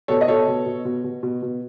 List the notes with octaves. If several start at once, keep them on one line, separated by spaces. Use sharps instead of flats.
B2 A4 C#5
D#5
B2 A4 C#5
B2
B2
B2
B2
B2
B2